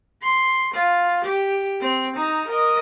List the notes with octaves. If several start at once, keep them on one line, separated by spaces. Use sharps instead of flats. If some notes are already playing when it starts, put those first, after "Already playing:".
C6
F4
G4
C4
D#4 A#5
A#4 D#5